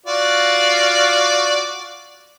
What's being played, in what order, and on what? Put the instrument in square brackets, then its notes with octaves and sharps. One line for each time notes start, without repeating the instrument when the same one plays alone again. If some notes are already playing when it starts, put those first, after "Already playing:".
[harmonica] F4 F#4 D5